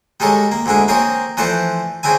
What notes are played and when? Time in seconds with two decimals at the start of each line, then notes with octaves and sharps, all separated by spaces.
0.20 G3 G#3 A4 A#4 C#5
0.52 A#3
0.66 D2 D3 G#3 D4 E4
0.88 A#3 C4 G#4 A#4 C#5
1.37 E3 F3 A3 C5 D5 F#5
2.03 C#3 C4 D4 E4 G#5